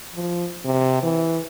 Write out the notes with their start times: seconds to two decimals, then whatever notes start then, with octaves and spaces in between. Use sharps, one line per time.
0.15 F3
0.64 C3
1.03 E3